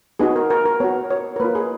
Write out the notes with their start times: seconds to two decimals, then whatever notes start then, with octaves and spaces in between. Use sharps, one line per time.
0.19 B3 D#4 F#4 G#4
0.36 A#4
0.50 A#4
0.65 A#4
0.80 B3 F#4 C#5
1.10 C#5
1.36 A#4
1.40 A#3 F4 B4
1.55 G#4